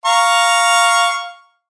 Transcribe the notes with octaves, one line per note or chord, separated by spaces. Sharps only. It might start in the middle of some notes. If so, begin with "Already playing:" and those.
F5 A#5 C#6